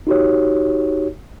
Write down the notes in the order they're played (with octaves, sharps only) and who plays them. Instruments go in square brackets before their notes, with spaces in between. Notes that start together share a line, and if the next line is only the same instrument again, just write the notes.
[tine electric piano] D#4 F#4 G4 C#5